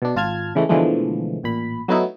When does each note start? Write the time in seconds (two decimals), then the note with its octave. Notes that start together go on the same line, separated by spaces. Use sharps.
0.02 B2 D4
0.16 G#1 F4 A5 F6 G#6
0.55 C#3 E3 G#3 A3
0.69 B2 D3 E3 F3 G#3 A3
1.43 A1 A#2 B5
1.88 F#3 A3 B3 D#4 E4